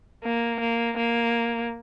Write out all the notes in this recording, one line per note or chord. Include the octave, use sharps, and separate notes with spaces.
A#3
A#3
A#3